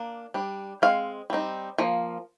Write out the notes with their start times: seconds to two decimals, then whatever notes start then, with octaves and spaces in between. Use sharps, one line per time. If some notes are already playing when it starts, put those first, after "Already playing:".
Already playing: A#3 D4
0.34 G3 D4
0.82 G#3 C4 F5
1.30 G3 C4 D#4
1.78 F3 A#3